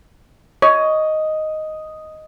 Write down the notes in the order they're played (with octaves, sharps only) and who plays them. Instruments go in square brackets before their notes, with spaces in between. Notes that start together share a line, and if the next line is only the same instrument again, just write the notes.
[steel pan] C#5 [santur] D#5